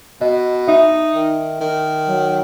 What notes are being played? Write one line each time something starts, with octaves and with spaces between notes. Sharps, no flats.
B2 D#5
D#4 E5
D#3
D#3
F#3